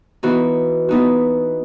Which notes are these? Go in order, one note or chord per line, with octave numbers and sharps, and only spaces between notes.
E3 B3 D#4 F#4
E3 B3 D#4 F#4